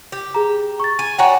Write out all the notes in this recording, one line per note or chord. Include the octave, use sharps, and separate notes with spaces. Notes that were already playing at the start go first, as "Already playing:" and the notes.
G4
G#4 A#5
C#6 A6
G#5 D#7
D4 F#4 C#5 G5 G#5 A#5